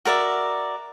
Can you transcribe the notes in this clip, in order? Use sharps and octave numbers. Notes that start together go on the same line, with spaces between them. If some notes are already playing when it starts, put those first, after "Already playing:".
F#4 A#4 D5 E5